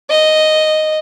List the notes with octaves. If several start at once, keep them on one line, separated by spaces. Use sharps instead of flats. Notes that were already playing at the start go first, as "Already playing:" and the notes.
D#5